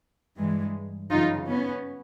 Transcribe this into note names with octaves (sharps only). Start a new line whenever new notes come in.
G2 E3 G#3
F#2 C#3 E3 D#4 F4
B3 C#4